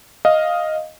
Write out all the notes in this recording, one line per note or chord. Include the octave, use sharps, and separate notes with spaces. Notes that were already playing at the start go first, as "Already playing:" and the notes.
D#5 F5